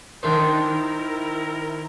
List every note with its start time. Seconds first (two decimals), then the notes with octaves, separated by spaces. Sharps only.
0.23 D#3 D4 D#4 C5
0.60 E4 A#4